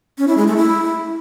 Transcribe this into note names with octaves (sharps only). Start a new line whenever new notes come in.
C#4
E4
G#3
A3
E4